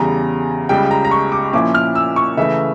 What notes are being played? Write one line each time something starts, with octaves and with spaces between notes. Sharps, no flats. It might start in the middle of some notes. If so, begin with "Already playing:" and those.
Already playing: E2 C#3 G3 A#5
C#2 C#3 G3 G5
A#5
A#5
C#6
D6
A#2 F3 C#4 E4 D6
F6
E6
C#6
C#3 E3 A3 E5